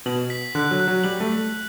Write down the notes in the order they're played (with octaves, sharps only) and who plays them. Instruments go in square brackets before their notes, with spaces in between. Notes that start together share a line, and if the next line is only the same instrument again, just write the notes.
[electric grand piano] B2 [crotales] F#7
[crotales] B6
[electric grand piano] D3 [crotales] F#6
[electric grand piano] F#3
[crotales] F#6
[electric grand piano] F#3
[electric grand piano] G3 [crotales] F#7
[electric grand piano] A3